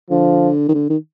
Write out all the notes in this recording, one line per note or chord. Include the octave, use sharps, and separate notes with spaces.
D3 F3
D#3
D3
D#3